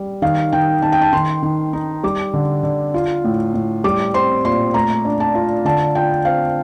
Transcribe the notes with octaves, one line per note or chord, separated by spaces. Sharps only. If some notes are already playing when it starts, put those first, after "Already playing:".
Already playing: G3
D#3 F5
D#3 G5
D#3 A5
G5
A5
D#3 C6
D#3
D#4
G3 D6
D3
D3
F4
A2
A2
G3 D6
C4 C6
A#2 C6
A3 A#5
D4
A5
F4
D3 A5
F4 G5
C4 F5